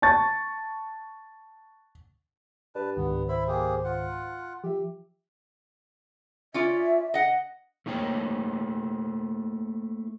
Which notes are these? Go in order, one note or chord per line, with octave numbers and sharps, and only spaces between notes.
A5 C#6 A6
G2 B4 D5 A5
C#2 G#2 D#3 B3
E4 C5 E5 B5
A#3 G4 G#4
F4 F#5
F3 G4 E5
C#4 F4 D5 E5
D#5 F#5
A3 A#3 D#4 C#5 G5